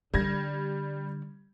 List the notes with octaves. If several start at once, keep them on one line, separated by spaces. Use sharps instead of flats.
D3 G3 G#6 A#6